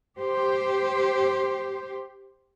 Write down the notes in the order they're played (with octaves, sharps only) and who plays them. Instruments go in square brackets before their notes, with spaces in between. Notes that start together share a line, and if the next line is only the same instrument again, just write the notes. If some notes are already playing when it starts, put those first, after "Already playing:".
[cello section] G4 C5